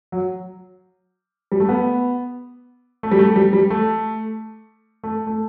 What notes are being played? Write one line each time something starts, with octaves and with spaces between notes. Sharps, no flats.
F#3
G3
A3
B3
A3
G3
A3
G3
G3
A3
A3
A3